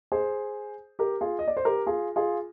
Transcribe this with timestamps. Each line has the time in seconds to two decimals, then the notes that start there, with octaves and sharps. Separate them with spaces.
0.12 G#4 C5
0.99 G4 A#4
1.21 F4 G#4
1.39 D#5
1.48 D5
1.57 C5
1.65 G4 A#4
1.86 F4 G#4
2.16 F4 G#4